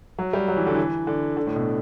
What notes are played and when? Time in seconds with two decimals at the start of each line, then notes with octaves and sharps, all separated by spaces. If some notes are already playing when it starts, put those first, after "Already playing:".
0.18 F#3
0.33 G3
0.48 F#3
0.57 E3
0.67 D3
0.75 E3
1.07 D3
1.37 D3
1.46 A2
1.56 B2